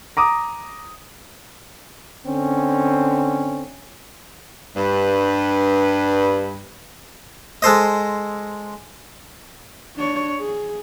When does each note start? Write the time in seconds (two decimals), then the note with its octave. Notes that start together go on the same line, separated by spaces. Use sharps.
0.17 A#5 D6 D#6
2.27 D3 C4 C#4
4.77 G2 B4
7.62 G#3 A4 C5 D#5
9.96 D4 C#5
10.40 G#4